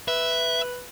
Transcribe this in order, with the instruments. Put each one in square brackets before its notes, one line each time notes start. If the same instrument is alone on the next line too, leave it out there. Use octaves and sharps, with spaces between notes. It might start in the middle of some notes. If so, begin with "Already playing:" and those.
[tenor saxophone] B4 [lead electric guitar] E5